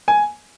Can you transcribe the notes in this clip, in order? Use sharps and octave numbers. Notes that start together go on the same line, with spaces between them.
G#5